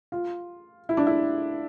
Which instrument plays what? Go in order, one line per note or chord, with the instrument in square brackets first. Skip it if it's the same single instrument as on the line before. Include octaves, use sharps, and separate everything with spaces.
[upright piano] F4
E4
D4
E4